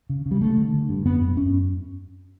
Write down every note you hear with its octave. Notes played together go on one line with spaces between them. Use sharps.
C#3
C#3
G3
D3 A3
D3
D3
G2
F#2 B3
F#2
F#2 C#4